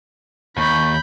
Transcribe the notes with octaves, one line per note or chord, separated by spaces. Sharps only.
D#2 B5 C#6 G6